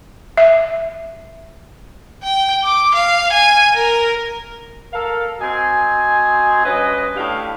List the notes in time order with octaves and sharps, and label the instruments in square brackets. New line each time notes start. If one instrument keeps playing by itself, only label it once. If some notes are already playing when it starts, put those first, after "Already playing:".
[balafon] E5
[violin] G5
D6
F5
G#5
A#4
[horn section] A4 A#4 F5
C4 F#4 D#5 G#5
G2 C#4 B4 D#5
A2 D4 G4 F5